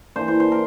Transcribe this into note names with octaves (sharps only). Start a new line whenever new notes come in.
E3 A#3 D4 C5
C5
C5
A#4